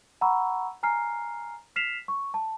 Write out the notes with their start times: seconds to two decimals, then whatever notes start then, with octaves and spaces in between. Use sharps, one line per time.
0.21 F#5 A#5 B5 C#6 E6
0.83 G#5 A#5 F6 C7
1.76 F6 B6 C7 E7 F7
2.08 C#6
2.34 A5